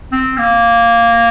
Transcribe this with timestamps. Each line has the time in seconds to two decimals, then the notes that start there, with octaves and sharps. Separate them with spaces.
0.12 C4
0.38 A#3